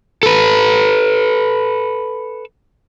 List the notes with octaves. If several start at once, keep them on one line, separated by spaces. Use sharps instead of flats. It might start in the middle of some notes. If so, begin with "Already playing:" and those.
A4 B4